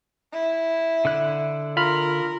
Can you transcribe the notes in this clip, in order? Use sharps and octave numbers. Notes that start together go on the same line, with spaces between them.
E4
D3 F#6
F4 A#4 B5 F6